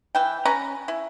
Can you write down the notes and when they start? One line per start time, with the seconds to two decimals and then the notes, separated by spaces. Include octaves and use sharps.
0.15 E3 G5
0.45 C#4 B4 A#5
0.88 E4